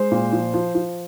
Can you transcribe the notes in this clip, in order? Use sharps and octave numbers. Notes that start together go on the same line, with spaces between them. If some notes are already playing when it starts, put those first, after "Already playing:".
Already playing: G#3 C5
A#2
F3
F3
F3